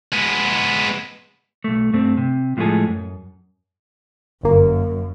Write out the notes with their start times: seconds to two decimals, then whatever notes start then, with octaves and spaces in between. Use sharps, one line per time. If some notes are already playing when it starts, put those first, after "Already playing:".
0.13 G#3 B3
1.64 B1 A3
1.93 G2 A3 C4
2.17 C3
2.57 A2 F3 G#3 A3 G#4 A4
2.86 F#2
4.43 G1 F#2 A#3